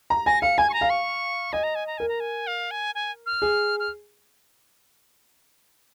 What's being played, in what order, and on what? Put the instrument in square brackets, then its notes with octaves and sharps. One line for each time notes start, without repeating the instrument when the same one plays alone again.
[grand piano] A#5
[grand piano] G#5 [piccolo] A#6
[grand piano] F5 [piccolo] C#7
[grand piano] G#5 [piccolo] G#6
[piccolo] C#6
A#5
[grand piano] F5
[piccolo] C#6
[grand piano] D#5 [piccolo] G#5
[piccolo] A#5
G#5
A#5
[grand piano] A#4 [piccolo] G#5
[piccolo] A#5
G#5
F5
G#5
G#5
F6
[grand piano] G#4
[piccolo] F6